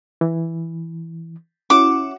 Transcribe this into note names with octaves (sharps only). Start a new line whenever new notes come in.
E3
C#4 E4 F#4 F#5 D6